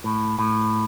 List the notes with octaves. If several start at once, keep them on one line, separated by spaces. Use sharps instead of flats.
A2
A2